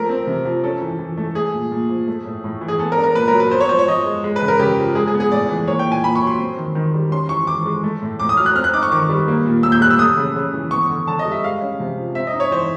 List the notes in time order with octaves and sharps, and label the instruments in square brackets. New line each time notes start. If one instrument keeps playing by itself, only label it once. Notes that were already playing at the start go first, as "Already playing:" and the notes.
Already playing: [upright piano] F3 A3 A#4
C4
C3
F3
C#4 A4
E3
E3
A3
A3 G#4
A#2
A#2
F3
A3
A2
A2
E3
G#4
B3 A4
A#4
D4
A#4
A#2 B4
A#4
F#3
B4
B3 C5
C#5
F3 C5
C#5
F3 D#5
G#3
G#3
B4
C#3
A#4
C#3 G4
F3
G#3 G#4
G#4
B3
G#4
A2 D5
E3
A#3 C#5
G5
A#2
G#5
A#2 B5
C#6
F#3
C6
C4
D#3
D#3
G3
C#4 C6
E3 C#6
E3 D6
G#3
A3
A2
A2 D6
D#6
F#3 F6
F#6
C4 F6
F#6
D#4 D6
C#6
D#3 D6
G3
A#3
A#2
A#2 E6
G6
G3 F#6
E6
A3 D#6
C#3
C#3
E3
B3 C#6
D3
D3 A5
D#5
G3
E5
G#3 F5
C#4
C3
F3
C4 E5
D#5
D#4
C#5
E3 C5